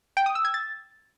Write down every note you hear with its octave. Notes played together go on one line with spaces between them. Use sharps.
G5
D#6
E6
G#6
A6